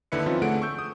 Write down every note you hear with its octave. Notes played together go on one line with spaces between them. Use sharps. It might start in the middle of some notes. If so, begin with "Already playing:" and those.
D#2 D3 E4 B4 C#7
E3 F3 C4 C#4 D#4 F4
D3 A3 G#4 F#5 D7
C#6 E6 G6
D#6